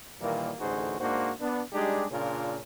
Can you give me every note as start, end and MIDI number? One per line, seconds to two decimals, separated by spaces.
0.21 0.52 46
0.21 0.52 51
0.21 0.52 52
0.21 0.52 55
0.21 0.52 58
0.59 0.96 33
0.59 0.96 38
0.59 0.96 63
0.59 0.96 66
0.59 0.96 68
0.59 0.96 72
1.00 1.32 44
1.00 1.32 58
1.00 1.32 62
1.00 1.32 66
1.00 1.32 72
1.41 1.61 59
1.41 1.61 62
1.73 2.06 55
1.73 2.06 56
1.73 2.06 62
1.73 2.06 63
1.73 2.06 67
1.73 2.06 68
2.11 2.60 46
2.11 2.60 49
2.11 2.60 61
2.11 2.60 62
2.11 2.60 65
2.11 2.60 70